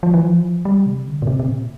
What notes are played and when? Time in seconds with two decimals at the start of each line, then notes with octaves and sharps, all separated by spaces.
0.03 F3
0.14 E3
0.25 F3
0.65 G3
0.86 C3
1.07 D3
1.22 A#2
1.27 C3
1.40 C3
1.48 A#2